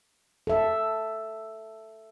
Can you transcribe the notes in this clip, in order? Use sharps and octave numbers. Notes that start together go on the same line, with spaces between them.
A4 E5